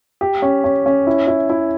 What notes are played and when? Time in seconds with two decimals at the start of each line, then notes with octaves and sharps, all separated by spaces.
0.21 G4
0.42 C#4
0.64 C#4
0.86 C#4
1.07 E4
1.27 E4
1.50 E4